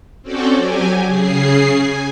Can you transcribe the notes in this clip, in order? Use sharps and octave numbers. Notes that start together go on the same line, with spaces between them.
C4 C#4 F#4 A4 D5 G5
F#3 G4 G#5
C#3 G#4 C7
G#5